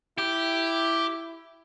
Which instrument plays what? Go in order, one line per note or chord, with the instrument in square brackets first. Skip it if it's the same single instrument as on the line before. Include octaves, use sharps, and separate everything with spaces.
[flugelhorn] E4 [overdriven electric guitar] G4